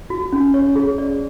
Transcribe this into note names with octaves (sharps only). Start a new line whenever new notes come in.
F#4
C#4
C#5
G#4
D5